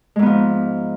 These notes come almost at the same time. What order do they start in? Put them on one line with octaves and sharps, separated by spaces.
G#3 G#2 B3 F3